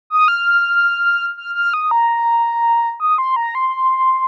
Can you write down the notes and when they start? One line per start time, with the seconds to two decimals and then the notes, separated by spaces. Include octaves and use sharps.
0.10 D#6
0.28 F6
1.37 F6
1.55 F6
1.74 D#6
1.91 A#5
3.00 D#6
3.18 C6
3.36 A#5
3.55 C6